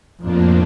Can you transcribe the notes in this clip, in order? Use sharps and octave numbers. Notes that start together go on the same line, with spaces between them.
F2 A2 F3 A#3 D4